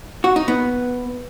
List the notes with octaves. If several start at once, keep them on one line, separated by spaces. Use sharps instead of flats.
F#4
D#4
B3